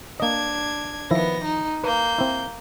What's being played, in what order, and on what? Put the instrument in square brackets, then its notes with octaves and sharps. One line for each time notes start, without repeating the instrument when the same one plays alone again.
[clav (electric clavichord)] A#3 D#5 [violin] D4 G#6
[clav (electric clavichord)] D#3 F3 E4 [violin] B3 A#6
[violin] D#4
[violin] A#3 G6 [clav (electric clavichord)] B4
[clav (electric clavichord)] C4 E4